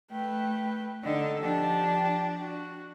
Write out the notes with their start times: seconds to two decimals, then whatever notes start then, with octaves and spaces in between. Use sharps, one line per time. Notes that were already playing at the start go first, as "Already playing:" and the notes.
0.11 A3 B4 G5
1.03 D3 D#4 A4 D#5
1.40 F3 D4 G4 A5
2.39 F#4